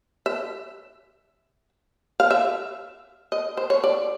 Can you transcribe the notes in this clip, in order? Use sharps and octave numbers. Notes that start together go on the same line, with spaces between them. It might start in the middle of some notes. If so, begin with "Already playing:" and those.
E5
F5
E5
D#5
C5
C#5
D5